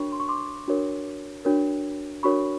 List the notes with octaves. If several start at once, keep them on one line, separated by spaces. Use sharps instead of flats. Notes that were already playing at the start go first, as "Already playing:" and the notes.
Already playing: D4 F#4 A#4 C#5 B5 C#6
C6
C#6
C6 D6
D4 F#4 A#4 C#5
D4 F#4 A#4 C#5
D4 F#4 A#4 C#5 B5 C#6